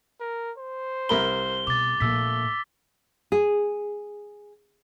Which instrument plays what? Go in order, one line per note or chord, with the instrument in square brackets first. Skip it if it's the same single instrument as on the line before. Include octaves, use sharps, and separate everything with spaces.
[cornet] A#4
C5
[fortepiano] C2 A#4 B5 [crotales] G7
[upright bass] B2 [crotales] D6 A6
[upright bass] A#1 A#2 [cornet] A3 [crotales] E6 B6
[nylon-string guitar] G#4